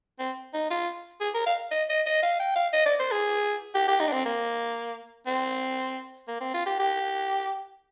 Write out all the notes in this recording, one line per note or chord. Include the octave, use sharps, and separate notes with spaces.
C4
D#4
F4
G#4
A#4
F5
D#5
D#5
D#5
F5
G5
F5
D#5
D5
C5
G#4
G4
G4
D#4
D4
C4
A#3
C4
A#3
C4
F4
G4
G4